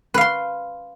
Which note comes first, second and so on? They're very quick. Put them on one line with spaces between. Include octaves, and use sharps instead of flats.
B4 F5 C6